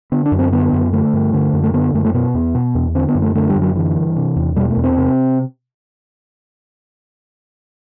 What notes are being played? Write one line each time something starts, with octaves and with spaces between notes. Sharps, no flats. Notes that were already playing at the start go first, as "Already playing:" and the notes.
D3 B3
D4
F#2
C4
D3 B3
F#2
D3 A3
G2
D3
F#2
A3
D3 B3
F#2 A3
A3
B2 B3
E2
B2
E2
D3 C4
B3
F#2
A3
D3 A3
G3
F#2
F#3
D3 E3
G2
C3
E2
B2 G3
A3
E2
C4
C3